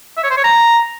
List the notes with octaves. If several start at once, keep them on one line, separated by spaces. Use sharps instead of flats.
E5
C#5
C5
C#5
A#5